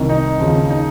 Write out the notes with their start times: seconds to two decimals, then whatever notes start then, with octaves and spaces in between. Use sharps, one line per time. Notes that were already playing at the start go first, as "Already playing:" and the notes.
Already playing: C2 C3 D#3
0.09 D#4
0.40 D#2 C#3 F3
0.70 D#4